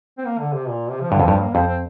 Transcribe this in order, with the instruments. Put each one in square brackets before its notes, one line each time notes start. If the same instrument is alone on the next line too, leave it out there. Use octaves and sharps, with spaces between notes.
[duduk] C4
A#3
D3
C3
A#2
C3
F3
[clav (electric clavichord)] G2 [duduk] D3
[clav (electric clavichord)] F2
[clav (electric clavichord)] G2 [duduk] F3
[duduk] A#3
[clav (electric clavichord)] F2 [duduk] C4
[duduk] C4